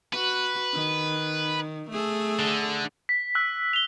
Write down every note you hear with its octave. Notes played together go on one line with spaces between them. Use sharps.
F#4 B4
D#3
A3 G#4 A4
D3
B6
E6 F#6
F7 G7